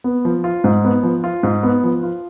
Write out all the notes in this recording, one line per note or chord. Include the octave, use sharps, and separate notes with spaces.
B3
F3
F4
G#2
B3
F3
F4
G#2
B3
F3
F4